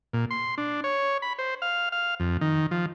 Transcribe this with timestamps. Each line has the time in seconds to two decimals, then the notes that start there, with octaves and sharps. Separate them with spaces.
0.13 A#2
0.31 C6
0.58 D4
0.84 C#5
1.22 B5
1.39 C5
1.62 F5
1.92 F5
2.20 F2
2.41 D#3
2.71 F3